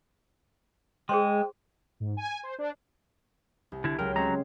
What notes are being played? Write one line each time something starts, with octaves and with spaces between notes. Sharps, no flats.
G#3 G#4 C5 G5 C6
G#2
G#5
C5
D4
C2
D3 E4
C#2 F#3 A#4 G5
F#3 G#3 C4 C#4 A#5